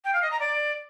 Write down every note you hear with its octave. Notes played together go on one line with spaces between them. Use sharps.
G5
F5
D#5
A#5
D5